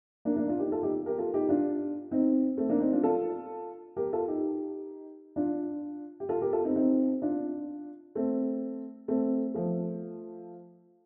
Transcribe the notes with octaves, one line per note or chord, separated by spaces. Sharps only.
A#3 D4
A#3 D4
D4 F4
D#4 G4
F4 A4
D#4 G4
G4 A#4
F4 A4
D#4 G4
D4 F4
C4 D#4
A3 C4
A#3 D4
C4 D#4
D4 F4
F4 A4
G4 A#4
F4 A4
D#4 G4
D4 F4
G4
F4 A4
G4 A#4
F4 A4
C4 D#4
C4 D#4
D4 F4
A3 C4
A3 C4
F3 A3